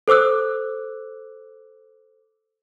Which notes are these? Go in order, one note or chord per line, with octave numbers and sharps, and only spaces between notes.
A4 C5 D6 E6 F#6